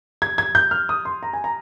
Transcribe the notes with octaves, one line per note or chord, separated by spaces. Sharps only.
G#6
G#6
G6
F6
D#6
C6
A#5
G#5
A#5